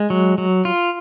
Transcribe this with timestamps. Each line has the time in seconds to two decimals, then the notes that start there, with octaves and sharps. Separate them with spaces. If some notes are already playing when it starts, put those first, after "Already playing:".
Already playing: G#3
0.10 F#3
0.38 F#3
0.65 F4